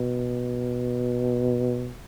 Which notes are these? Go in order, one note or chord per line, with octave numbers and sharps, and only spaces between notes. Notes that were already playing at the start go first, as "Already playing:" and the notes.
Already playing: B2